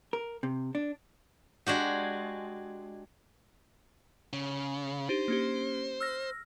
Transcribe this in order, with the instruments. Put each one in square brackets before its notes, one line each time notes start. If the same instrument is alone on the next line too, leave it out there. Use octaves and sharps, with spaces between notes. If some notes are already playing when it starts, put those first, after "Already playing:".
[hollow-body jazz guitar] A#4
C3
D4
[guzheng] G#3 D4 F#4 G4
[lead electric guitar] C#3
[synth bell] D4 D#4 G4 [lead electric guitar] C5
[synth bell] A#3 C#4 G4
E6 F6 A#6